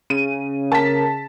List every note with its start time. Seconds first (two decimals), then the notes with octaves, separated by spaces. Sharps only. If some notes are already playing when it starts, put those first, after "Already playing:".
0.10 C#3 D#7
0.72 A#3 A5 B6